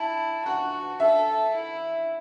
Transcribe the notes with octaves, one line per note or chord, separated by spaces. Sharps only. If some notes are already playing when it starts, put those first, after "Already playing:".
Already playing: E4 A5
F#4 F#5
A4 E5
E4